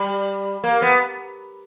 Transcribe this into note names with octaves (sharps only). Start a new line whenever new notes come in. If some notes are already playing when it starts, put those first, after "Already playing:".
Already playing: G3
A#3
B3